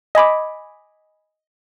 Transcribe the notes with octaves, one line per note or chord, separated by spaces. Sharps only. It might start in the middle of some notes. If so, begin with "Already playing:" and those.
D#5 G#5 B5 D6